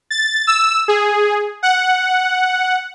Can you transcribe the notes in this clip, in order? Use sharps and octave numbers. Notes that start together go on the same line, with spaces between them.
A6
E6
G#4
F#5